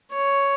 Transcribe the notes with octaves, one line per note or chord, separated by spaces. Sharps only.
C#5